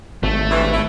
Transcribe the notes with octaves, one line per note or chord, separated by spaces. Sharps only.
G#1 A3
G2 E3
E4